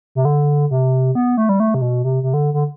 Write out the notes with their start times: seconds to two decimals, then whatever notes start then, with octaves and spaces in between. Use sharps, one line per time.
0.15 C3
0.25 D3
0.71 C3
1.15 B3
1.37 A3
1.49 G3
1.60 A3
1.74 C3
1.82 B2
2.04 C3
2.23 C3
2.34 D3
2.54 D3